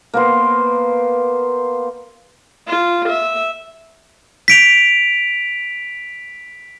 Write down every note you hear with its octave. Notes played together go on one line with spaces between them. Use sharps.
A#3 B3 C5
F4
E5
B6 D7 F7